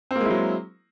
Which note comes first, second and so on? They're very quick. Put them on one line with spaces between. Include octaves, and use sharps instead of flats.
C4 A#3 G#3 E4 F#3